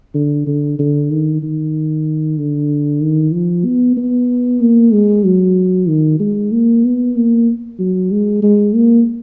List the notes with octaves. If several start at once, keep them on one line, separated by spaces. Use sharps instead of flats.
D3
D3
D3
D#3
D#3
D3
D#3
F3
B3
B3
A#3
G#3
F#3
D#3
G#3
A#3
B3
A#3
F#3
G#3
G#3
A#3